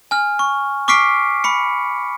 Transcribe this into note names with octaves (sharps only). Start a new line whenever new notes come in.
G#5 F6
C#6
C#6 D6 F6 B6 C7 D7
B5 C#7